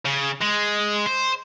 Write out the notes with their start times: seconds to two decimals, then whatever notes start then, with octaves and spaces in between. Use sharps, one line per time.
0.05 C#3
0.41 G#3
1.06 C5